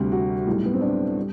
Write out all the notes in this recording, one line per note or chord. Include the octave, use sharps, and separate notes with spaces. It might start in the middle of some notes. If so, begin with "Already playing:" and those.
Already playing: D2 C3 G3
F#4
B1 A2 G3
B3
C4
D4
G3